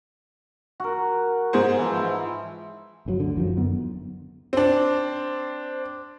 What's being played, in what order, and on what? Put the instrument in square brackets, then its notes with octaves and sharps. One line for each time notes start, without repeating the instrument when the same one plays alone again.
[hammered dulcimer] F#4 A#4
[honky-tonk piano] G#2 G#4 C5
[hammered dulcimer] E3 F3
E4
[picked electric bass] G1 C#3 F#3
D2 D3
F#1 D#3 F3 F#3
F#2 D3 B3
[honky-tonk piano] C4 D4